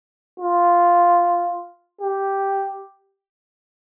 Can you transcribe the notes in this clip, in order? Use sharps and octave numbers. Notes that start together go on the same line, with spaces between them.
F4
G4